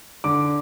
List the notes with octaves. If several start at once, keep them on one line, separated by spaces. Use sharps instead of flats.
D3 D6